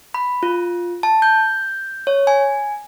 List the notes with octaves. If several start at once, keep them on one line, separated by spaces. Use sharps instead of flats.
B5
F4
A5
G6
C#5
G#5